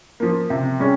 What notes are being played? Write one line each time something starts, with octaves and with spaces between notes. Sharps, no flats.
F3 A#3
C3
G3 C#4 G#4